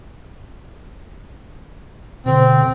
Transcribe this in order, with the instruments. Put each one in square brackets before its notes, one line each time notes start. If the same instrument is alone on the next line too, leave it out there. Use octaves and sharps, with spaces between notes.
[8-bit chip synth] B2 D3 [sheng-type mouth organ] C4